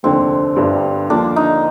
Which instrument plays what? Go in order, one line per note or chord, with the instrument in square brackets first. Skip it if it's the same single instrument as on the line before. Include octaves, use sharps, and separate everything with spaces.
[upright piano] F1 D#2 D3 [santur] C4
[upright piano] G1 G2 D3 G3
[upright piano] D#2 D3 F3 A#3 [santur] D4
[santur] D#4